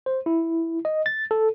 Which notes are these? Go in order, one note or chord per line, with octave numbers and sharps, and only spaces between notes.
C5
E4
D#5
A6
A4